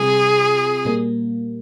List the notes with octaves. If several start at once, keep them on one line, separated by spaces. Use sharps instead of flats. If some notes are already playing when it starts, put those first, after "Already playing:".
Already playing: C3 G3 C4 F4 G#4
A#2 G3 A#3